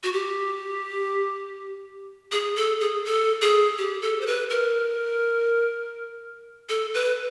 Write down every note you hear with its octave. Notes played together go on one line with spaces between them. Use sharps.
F#4
G4
G#4
A4
G#4
A4
G#4
G4
A4
C5
B4
A#4
A4
B4